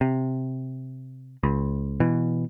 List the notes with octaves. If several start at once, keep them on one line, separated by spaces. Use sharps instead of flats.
C3
C#2
B2 E3